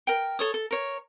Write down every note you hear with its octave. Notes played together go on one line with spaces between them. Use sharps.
A#4 G5
A4 C#5 D#6
A4
A#4 C#5